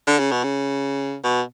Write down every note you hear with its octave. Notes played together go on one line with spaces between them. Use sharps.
D3
C#3
B2
C#3
B2